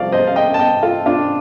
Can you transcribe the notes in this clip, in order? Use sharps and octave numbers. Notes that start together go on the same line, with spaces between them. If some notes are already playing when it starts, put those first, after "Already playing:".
Already playing: C2 C3 F3 D5 F5
C5 D#5
F5
D#5 G5
A5
D#5 G5
F4 A4
D4 F4